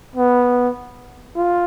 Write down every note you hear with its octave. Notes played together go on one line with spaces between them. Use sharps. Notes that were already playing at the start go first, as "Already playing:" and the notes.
B3
F4